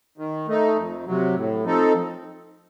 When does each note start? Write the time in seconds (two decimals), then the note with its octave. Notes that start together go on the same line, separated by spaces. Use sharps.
0.18 D#3
0.48 A3 D#4
0.76 F2
1.06 C3 F#3
1.35 A2
1.64 F3 C4 D#4 A4